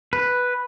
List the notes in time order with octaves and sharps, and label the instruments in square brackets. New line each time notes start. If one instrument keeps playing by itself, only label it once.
[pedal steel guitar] B4